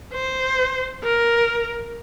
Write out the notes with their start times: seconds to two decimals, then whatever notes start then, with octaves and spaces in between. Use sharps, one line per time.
0.14 C5
1.04 A#4